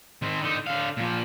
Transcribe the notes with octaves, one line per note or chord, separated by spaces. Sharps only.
D#3 C4
D3 D#4
D3 F5
A#2 F3